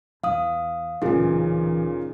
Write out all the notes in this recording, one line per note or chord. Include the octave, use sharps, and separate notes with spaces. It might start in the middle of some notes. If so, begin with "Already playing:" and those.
E2 F5 D#6
D1 A#2 C#3 E3 D#4 G#4